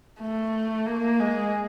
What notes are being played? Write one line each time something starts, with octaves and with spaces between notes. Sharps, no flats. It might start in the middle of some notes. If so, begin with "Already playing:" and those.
A3
A#3
G#3